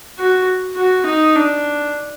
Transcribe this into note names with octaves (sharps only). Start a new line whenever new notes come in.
F#4
F#4
D#4
D4